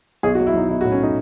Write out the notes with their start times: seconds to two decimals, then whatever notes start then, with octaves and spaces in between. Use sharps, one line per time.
0.23 B1 G#4
0.35 F#4
0.39 F#3
0.47 E4
0.54 B1 D#4
0.69 B1 E4
0.81 F#4
0.84 A2
0.92 C#4
0.99 A3 D#4